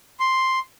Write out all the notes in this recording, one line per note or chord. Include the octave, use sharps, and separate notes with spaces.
C6